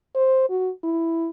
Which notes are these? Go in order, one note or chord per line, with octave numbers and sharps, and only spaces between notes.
C5
F#4
E4